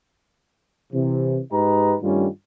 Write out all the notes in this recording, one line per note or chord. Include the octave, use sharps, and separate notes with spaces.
C3 E3
G#2 G4 B4 D#5 A#5
G2 D#3 G3 A3 C#4 F4